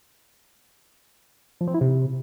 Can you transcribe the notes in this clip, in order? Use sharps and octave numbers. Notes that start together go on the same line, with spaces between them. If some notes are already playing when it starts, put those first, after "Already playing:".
F3
C4
E4
C3